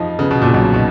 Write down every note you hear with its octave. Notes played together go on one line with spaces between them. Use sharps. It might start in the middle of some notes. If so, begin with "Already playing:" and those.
Already playing: F2 F3 D#4
C#3 B3
B2
F2 A#2
B1 B2
B2 D#4